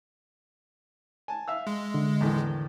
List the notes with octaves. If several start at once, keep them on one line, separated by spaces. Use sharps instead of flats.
G#5 A5
E5 F5 E6
G#3
D3
E2 A2 D#3